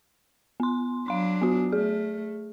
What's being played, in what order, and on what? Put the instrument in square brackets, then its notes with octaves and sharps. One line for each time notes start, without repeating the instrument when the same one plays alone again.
[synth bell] B3 C6
[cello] F#3 D4 [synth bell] F5 C6
[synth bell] B3 F#4
[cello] A3 [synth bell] G#4